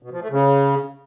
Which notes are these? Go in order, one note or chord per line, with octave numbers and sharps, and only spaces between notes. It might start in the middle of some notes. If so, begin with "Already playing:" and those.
B2
F3
A3
C#3